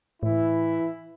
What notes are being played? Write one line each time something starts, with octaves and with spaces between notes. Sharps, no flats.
A2 E3 E4